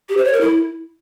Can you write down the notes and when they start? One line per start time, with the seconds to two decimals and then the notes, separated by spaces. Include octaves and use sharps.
0.09 G4
0.17 C5
0.25 C#5
0.33 A#4
0.41 E4